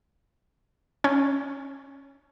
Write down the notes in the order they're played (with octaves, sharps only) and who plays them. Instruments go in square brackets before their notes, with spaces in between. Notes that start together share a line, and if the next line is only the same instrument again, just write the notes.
[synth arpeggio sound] C#4